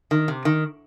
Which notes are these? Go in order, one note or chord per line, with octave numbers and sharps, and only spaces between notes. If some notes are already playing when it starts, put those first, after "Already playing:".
D#3
C3
D#3